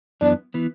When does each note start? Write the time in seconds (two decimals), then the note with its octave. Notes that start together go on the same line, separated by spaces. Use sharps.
0.21 F#2 E3 B3 D4
0.54 E3 B3